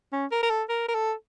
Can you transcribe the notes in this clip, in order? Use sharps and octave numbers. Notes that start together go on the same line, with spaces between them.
C#4
A#4
A#4
A4
A#4
A#4
A4